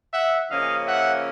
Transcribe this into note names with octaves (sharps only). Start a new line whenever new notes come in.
E5 F#5
C#3 F3 A#3 C#4 D#5 F5
E5 F#5